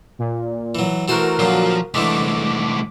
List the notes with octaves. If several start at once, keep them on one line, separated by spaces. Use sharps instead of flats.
A#2
E3 F#3
E3 A3 F#4 A#4 C5
A#2 D3 F3 F#3
C2 D3 E3 G#3 A3 D6